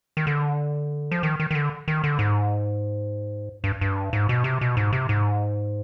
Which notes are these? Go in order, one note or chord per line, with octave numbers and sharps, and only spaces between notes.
D#3
D3
F3
D#3
D#3
D#3
D3
D#3
D3
G#2
G2
G2
G#2
B2
C3
B2
G#2
C3
G#2